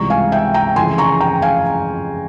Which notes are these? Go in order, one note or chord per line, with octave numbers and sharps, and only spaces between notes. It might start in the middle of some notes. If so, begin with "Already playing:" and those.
Already playing: C#2 C3 E3 G3 A#5 C#6
F5 G#5
E5 G5
G5 A#5
F2 C#3 E3 G#5 C6
A#5 C#6
G5 A#5
F5 G#5